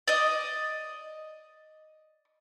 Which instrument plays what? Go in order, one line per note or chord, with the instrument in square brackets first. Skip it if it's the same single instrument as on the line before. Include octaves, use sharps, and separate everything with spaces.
[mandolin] D5 D#5